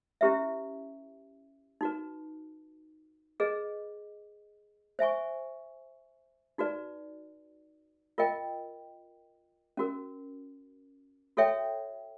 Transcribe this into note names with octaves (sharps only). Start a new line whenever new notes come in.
C#4 E4 G4 B4 E5
D#4 F#4 B4
G#4 B4 D#5
C5 E5 G#5 C#6
D#4 F#4 B4 D5
F4 A#4 D#5 G5
C#4 F#4 A#4
F#4 A4 C#5 E5 G5